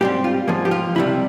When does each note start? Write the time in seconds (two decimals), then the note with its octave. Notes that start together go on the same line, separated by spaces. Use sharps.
0.01 G#2 G3 C4 G4
0.24 F4
0.48 G#2 F3 A#3 G#4
0.65 G4
0.71 F4
0.95 C#2 C3 G3 E4